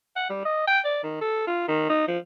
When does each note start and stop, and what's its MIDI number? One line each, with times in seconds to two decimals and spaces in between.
0.16 0.27 78
0.29 0.42 55
0.45 0.63 75
0.67 0.79 79
0.85 1.00 74
1.03 1.19 51
1.21 1.45 69
1.47 1.67 65
1.68 1.86 51
1.90 2.07 63
2.08 2.18 53